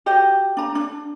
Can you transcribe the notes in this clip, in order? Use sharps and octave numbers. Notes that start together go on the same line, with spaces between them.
F#4 G4 D#5
D4 A#5
D4